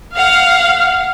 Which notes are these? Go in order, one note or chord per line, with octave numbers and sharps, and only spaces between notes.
F5 F#5